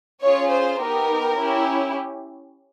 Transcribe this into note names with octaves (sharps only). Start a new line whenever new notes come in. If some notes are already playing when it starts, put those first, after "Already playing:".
C#4 F4 G#4 C#5
C5
B3 D#4 G4 A#4
C#4 E4 G4